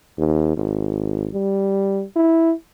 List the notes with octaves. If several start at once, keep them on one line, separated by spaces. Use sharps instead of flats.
D#2
G#1
G3
E4